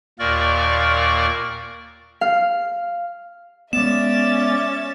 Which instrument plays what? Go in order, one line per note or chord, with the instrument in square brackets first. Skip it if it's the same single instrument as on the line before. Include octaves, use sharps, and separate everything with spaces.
[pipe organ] D#2 A#2 A#3 A#4 D5 C#6
[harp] F5
[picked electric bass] G#3 B3 [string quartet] C#4 E5 A6 [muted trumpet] D5 [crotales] E7